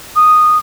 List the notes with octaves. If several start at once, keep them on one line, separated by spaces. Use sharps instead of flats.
D#6